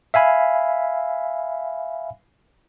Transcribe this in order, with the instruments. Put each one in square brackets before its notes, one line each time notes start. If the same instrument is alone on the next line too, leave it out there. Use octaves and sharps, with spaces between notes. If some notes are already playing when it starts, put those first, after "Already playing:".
[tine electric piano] E5 F5 G#5 B5